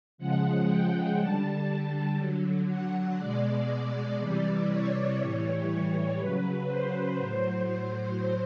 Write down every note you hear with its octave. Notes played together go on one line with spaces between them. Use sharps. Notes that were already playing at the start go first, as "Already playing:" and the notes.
C#3 F3 G#3 F#5
G5
D3 G3 A5
D3 F#3
F#5
B2 G#3 D5
D5
C3 E3 G3 D5
C#5
A2 E3 G3
C#3 F#3 B4
C5
A2 F#3 C5
C5